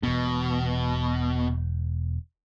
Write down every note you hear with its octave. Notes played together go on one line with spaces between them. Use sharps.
E1 B2 B3